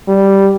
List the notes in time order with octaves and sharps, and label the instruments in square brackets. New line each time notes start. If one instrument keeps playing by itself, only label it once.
[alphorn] G3